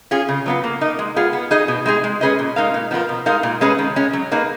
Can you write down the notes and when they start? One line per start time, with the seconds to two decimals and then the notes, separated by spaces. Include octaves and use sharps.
0.11 C#4 F4 G#4
0.29 C#3
0.46 F#3 B3 F4 B4
0.64 A#3
0.81 D#4 A#4 D#5
0.99 G#3
1.16 B3 F4 G#4
1.33 B3
1.51 D#4 G#4 D#5
1.68 B2
1.86 G#3 D#4 G#4
2.04 G#3
2.21 C#4 G#4 B4 D#5
2.39 A#2
2.56 G#3 D#4 A#4 F5
2.74 A#2
2.91 F3 B3 F4 A#4
3.09 B2
3.26 G#3 D#4 A#4 F5
3.43 A#2
3.61 G#3 C#4 G#4 B4
3.79 D#3
3.96 G#3 C#4
4.13 F#3
4.32 A#3 D#4 G#4 B4